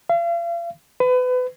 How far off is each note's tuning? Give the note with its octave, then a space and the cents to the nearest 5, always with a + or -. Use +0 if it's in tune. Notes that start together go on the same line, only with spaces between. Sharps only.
F5 -40
B4 +30